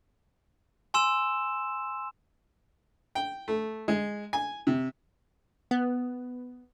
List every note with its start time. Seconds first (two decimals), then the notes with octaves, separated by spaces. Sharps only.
0.94 G#5 C6 E6 E7
3.15 G5
3.48 A3
3.88 G#3
4.33 G#5
4.67 C3
5.71 B3